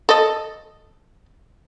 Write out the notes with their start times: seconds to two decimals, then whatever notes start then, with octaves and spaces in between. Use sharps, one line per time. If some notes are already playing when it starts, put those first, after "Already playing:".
0.09 A4 D#5